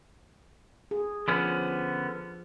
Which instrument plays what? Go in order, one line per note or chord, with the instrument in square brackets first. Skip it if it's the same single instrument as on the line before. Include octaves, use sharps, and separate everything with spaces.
[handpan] G#4
[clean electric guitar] D3 B3 C#4 [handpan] F3